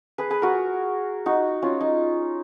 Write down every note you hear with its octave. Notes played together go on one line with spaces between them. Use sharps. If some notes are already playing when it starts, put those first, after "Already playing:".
G#4 B4
G#4 B4
F#4 A#4
D#4 F#4
C#4 F4
D#4